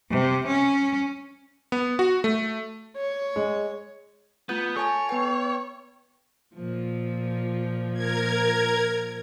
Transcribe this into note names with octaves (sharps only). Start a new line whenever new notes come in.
C3
C#4
B3
F#4
A3
C#5
G#3
A3 B3 F4 G6
A4 C#5 G#5 A5
B3 B4 G5
A#2 F3
A#4 G#6